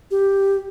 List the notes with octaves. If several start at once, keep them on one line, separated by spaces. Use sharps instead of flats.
G4